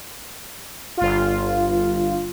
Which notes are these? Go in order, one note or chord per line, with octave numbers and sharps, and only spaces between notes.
G1 F4